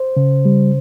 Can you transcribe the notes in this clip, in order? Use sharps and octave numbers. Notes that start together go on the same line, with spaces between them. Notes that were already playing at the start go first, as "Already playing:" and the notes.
Already playing: C5
C#3
G3